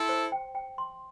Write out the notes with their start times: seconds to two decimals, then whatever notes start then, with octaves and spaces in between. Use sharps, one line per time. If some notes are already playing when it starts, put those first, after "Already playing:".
Already playing: E4 A4 C6
0.09 C5
0.32 G5
0.55 G5
0.78 C6